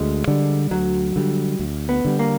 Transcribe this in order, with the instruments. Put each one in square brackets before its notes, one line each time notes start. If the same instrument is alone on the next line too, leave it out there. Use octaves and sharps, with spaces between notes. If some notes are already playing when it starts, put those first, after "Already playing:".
Already playing: [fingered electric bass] D2 [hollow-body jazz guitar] G#3
[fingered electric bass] D3 G3
[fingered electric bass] D2 [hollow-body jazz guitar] F#3
[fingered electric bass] D3 G3
D2
[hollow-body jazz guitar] B3
[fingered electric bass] D3 G3
[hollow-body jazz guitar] A#3